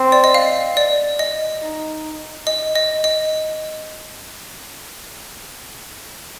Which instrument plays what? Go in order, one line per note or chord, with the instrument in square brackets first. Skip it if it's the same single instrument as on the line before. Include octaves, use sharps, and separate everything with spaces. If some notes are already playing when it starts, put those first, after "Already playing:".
Already playing: [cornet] C4
[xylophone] D5
D#5
F5
D5
D#5
[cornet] D#4
[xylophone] D#5
D#5
D#5